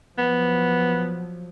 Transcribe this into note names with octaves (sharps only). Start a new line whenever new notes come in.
F3 F#3 B3